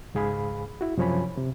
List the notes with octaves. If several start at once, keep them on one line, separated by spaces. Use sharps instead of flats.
C#2 G#2 G#4 F5 B5
E4 F#4
F#2 C3 F3 C#5 G#5 B5
C3